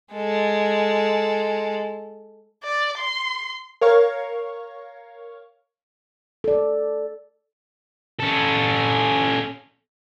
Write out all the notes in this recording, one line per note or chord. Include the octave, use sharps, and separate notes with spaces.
G#3 A4
D5
C6
A#4 C#5 F5 C#6
A4 D5
C#4 A4